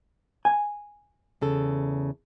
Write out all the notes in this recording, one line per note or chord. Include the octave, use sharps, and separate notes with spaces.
G#5
E2 C#3 A4